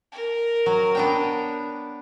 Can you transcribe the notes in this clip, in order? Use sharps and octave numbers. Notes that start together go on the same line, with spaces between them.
A#4
F#3
B3 D4 G5